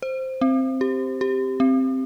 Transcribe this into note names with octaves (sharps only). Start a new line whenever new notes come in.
C5
C4
G4
G4
C4